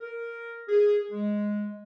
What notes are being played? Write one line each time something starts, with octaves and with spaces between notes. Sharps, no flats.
A#4
G#4
G#3